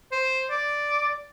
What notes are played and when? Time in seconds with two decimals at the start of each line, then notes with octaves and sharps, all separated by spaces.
0.12 C5
0.50 D5